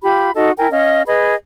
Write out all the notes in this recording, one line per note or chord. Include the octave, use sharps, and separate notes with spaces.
F4 G4 B5
D#4 F#4 A4 D#5
E4 A#4 G5 G#5
C#4 D#5 F5
G#4 B4 D#5 B5